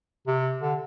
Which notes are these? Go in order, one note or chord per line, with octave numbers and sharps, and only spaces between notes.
C3
D3